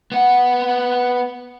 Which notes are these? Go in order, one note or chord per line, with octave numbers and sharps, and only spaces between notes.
B3 F#5